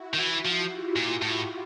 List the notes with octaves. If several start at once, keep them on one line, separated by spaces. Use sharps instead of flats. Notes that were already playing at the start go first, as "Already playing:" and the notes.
Already playing: E4 F#4
D#3
E3
F3
F4 G4
A#2
A2